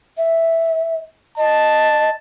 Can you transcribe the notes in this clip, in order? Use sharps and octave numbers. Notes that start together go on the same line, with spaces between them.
E5
D#5 A5